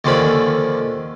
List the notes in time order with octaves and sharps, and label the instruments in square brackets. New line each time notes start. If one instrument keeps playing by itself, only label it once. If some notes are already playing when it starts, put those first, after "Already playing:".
[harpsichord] D#2 D3 F3 C#4 D5 B5